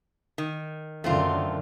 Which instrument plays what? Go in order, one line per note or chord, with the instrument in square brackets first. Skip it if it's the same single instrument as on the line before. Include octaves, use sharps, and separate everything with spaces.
[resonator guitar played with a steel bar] D#3
[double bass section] F#2 D3 D#3 [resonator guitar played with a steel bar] A3 C4 F4